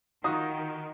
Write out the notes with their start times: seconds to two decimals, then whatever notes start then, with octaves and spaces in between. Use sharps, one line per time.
0.24 D#3 D#4 F4 F#4 D#6